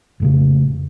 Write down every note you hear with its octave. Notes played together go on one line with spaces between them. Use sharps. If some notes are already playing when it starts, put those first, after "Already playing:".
F1 A2 C#3